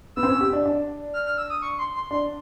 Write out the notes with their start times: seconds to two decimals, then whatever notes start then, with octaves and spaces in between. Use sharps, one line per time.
0.16 B3 E6
0.23 C4
0.29 C#4
0.40 G4
0.53 D4
0.66 D4
1.14 F6
1.26 F6
1.38 E6
1.50 D#6
1.62 C#6
1.78 C6
1.95 C6
2.11 D4 C6